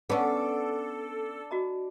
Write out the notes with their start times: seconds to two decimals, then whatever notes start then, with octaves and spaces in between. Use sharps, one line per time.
0.10 B3 C#4 D4 A4 D6
1.51 F#4 D#5 A#5